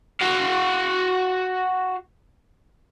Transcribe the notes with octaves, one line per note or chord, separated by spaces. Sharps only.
F#4 F5